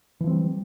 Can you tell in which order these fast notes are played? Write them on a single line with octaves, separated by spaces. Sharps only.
E3 F3 C4 G3